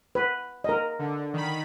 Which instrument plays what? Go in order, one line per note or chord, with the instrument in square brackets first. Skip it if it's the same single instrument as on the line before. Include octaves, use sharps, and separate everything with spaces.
[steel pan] B4
A#4 D#5
[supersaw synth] D3
D#3 B5